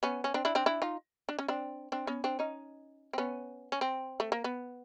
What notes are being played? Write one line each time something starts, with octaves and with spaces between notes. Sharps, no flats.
B3 C#4
C#4
C4 D4
D4 E4
C4 D4
D4 E4
D#4 F4
D4
C#4
C4 D4
C4 D4
B3 C#4
C4 D4
C#4 D#4
C4
B3 C#4
C#4
C4
A3
A#3
B3